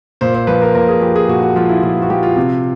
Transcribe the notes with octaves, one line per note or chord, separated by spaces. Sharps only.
A#2 C5
C5
F3 B4
A#4
A#2 A#4
G#4
F3 G4
G#4
A#2 F#4
F#4
F3 F4
E4
A#2 F4
F#4
F3 G4
F4
C3